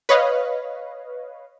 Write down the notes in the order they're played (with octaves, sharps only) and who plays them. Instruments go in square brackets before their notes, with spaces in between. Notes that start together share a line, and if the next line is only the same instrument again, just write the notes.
[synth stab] B4 C#5 D#5 F5